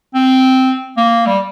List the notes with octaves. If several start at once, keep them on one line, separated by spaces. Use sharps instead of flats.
C4
A#3
G3